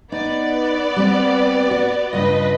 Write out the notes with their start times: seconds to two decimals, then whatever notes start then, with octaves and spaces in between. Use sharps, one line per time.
0.12 B3 D#4 D5
0.96 G3 C4 G4
1.71 F#4
2.13 G2 C#3 F4 B4 D#5